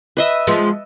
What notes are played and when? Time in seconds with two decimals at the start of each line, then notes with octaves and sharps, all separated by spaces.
0.17 B4 D#5 E5
0.47 F3 G#3 B3